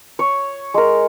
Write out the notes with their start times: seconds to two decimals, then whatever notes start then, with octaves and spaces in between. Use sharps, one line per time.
0.19 C#5
0.74 G#3 A#4